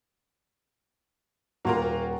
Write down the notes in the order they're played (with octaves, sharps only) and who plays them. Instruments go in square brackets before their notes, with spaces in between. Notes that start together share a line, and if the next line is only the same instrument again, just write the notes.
[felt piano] D#1 F#4 A#5 [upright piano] A#3 F4 A#4